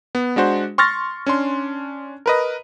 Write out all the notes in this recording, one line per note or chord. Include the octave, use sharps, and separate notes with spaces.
B3
G#3 D4 F#4 C5
C6 C#6 F6 A6 A#6
C#4 D4 C6
A#4 B4 D#5